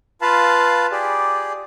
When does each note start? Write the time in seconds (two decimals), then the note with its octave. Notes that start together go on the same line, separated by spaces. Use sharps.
0.22 F4 B4 F5 A5 B5
0.91 G4 G#4 D5